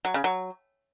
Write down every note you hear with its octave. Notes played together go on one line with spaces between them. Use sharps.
F#3
C#3
F#3